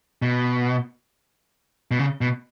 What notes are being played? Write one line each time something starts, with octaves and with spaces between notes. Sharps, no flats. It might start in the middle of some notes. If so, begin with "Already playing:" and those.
B2
B2
C#3
B2